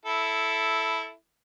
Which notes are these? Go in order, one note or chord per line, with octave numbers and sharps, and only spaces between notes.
E4 A4